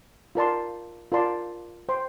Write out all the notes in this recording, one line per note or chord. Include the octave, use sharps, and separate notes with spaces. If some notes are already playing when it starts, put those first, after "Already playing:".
F4 A#4 D5 A5 C6
F4 A#4 D5 A5 C6
C5 G5 C6